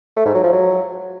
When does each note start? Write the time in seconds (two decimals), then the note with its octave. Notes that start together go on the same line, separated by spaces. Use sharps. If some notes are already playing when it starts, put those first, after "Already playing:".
0.17 A3
0.26 G#2
0.35 F#3
0.44 F3
0.53 F#3